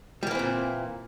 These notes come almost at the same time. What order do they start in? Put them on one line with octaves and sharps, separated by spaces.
G3 A#3 E3 C4 A#2